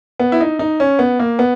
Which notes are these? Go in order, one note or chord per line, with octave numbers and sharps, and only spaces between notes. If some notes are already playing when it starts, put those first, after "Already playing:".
B3
E4
D#4
D#4
C#4
B3
A#3
B3